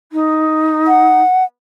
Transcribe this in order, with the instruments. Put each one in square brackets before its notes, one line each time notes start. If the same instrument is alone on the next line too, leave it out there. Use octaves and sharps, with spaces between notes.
[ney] D#4
[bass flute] F#5